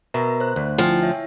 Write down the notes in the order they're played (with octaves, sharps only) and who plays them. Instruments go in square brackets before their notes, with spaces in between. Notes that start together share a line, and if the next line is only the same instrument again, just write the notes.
[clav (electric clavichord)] B2 [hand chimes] A#4 E5 A#5
[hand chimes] C5 F#6
[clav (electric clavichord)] D2
[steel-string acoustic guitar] F3 [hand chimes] G5 G#5
[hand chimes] C#5 E5